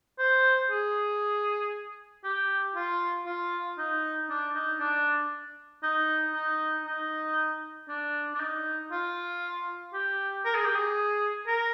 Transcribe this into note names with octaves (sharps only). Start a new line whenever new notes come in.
C5
G#4
G4
F4
F4
D#4
D4
D#4
D4
D#4
D#4
D#4
D4
D4
D#4
F4
G4
A#4
G#4
G4
G#4
A#4